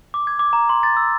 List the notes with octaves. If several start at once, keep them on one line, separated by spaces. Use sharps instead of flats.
D6
G#6
D6
A#5
C6
A6
E6